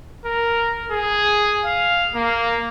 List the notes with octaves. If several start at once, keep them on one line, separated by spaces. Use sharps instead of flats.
A#4
G#4
F5
A#3